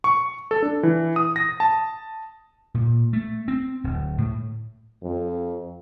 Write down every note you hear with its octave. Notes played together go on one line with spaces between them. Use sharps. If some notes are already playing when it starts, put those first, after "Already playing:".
C#6
A4
D4
E3
D#6
A#6
A5
A#2
A3
C4
D1
A2
F2